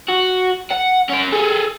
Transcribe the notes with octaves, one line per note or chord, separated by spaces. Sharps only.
F#4
F#5
C#4 A#4
G#4 A4